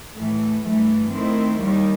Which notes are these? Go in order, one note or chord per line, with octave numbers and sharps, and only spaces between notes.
A2 E3 A3
G2 E3 A3
D#3 A3 C4 E4
D#2 D#3 G3